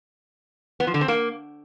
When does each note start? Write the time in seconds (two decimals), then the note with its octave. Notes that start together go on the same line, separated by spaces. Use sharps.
0.80 B3
0.87 F3
0.94 D3
1.01 C4
1.08 A#3